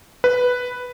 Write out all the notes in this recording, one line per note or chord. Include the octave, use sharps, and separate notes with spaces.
B4